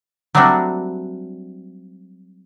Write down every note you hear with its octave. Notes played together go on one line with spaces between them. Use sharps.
F#3 G3 A3 C4 D4 F#4